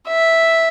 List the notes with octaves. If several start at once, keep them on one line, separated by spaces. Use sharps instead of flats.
E5